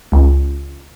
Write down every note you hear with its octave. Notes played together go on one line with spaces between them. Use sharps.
C#2